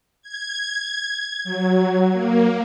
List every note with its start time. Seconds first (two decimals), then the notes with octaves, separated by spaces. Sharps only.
0.22 G#6
1.44 F#3
2.13 A#3